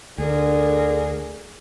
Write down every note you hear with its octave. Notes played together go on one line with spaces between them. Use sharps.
D2 D3 G#4 A#4